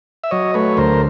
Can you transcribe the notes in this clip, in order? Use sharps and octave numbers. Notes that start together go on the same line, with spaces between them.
E5
F#3 C#5 D#5
A3 B4 C#5
D2 A#4 C5